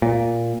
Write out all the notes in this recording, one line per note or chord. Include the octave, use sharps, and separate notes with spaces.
A#2